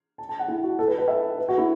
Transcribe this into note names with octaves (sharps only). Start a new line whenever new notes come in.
A5
A5
F#5
E4
F#4
A4
B4
B4
E5
B4
F#4
E4